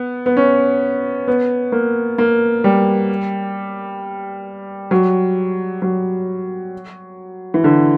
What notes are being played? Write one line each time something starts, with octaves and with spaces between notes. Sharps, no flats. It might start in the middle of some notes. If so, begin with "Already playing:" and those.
Already playing: B3
B3
C#4
B3
A#3
A#3
G3
F#3
F#3
E3
D3